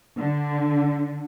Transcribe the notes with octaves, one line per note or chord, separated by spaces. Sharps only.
D3